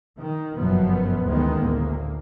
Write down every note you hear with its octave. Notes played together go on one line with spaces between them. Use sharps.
D#3
G1 F#2 B2 F3 F#3 B3
A1 D2 D#3 G#3 B3
D2 A2 A#3